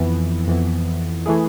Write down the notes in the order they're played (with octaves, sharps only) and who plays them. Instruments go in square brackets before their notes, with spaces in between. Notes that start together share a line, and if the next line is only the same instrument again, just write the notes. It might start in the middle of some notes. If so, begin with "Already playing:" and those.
Already playing: [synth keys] F2 E3 B3
F2 E3 B3
E3 A3 E4 G#4